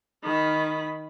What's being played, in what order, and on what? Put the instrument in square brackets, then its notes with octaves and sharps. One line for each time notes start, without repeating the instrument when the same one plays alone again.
[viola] D#3 B5